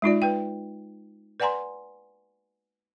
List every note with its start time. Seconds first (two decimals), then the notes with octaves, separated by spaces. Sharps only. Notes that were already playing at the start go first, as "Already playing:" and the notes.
0.02 G#3 D#4 F4 D5
0.22 B4 G5
1.40 B4 D5 F#5 G#5 A#5 C6